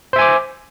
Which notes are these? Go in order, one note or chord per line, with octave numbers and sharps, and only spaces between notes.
C5 E5 G#5 D6